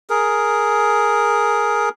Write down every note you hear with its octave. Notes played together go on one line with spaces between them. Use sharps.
G#4 A#4